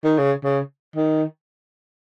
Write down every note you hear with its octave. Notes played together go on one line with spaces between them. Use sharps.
D#3
C#3
C#3
D#3